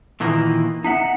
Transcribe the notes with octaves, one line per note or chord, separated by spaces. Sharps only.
A#2 D#3 E3 A#3
D#4 E5 F#5